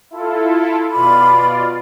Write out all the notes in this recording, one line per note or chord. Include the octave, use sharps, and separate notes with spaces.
E4 F4 A4
B2 F4 D5 B5